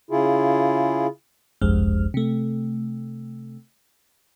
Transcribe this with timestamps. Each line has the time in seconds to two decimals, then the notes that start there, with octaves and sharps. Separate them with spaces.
0.11 C#3 E4 F4 G#4
1.61 G1 C2 F2 G#3 F6
2.14 C3 A3